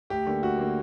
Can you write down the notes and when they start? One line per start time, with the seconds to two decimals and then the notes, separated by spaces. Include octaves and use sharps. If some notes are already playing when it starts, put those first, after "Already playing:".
0.10 D2 G4
0.26 D3 A#3
0.42 D2 F#4
0.59 D3 A#3